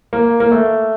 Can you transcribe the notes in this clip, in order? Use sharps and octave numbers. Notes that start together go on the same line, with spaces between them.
A#3
A#3
A3